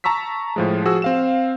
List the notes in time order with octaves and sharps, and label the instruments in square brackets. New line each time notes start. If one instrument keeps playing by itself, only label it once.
[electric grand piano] A5 A#5 C#6 E6 B6
A2 F3 G#3
F3 F#4 G#4 E6
C4 F5 E7